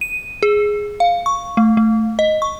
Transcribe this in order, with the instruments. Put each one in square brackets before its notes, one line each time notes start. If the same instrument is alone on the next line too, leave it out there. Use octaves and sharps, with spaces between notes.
[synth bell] D#7
G#4
F5
C#6
A3
A3
D#5
C#6